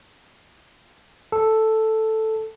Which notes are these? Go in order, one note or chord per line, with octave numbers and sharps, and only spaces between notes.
A4